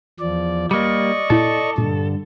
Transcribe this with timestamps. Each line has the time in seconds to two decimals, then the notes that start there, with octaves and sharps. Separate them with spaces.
0.20 E2 F3 D5
0.71 G3 A#3 D5 D#5 C#6
1.30 A#2 E4 A4
1.78 G2 A#2 D3